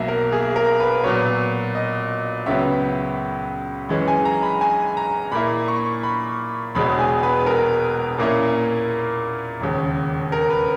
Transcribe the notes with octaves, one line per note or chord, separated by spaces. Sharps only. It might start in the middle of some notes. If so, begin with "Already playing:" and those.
Already playing: B1 B2 A#3 E5
A#4
G#4
A#4
B4
A#2 F#3 B3 C#5
D#5
C#2 C#3 F#3 B3 E5
F#2 E3 G#3 C#4
G#5
A#5
B5
G#5
A#5
A#2 A#3 E4 B5
C#6
B5
E1 E2 B2 G#3 B5
G#5
B4
A#4
A#2 A#3 C#4 E4
E1 D#2 C#3
A#4
B4